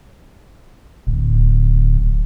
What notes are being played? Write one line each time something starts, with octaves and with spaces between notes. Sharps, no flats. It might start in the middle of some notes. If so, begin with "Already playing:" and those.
D1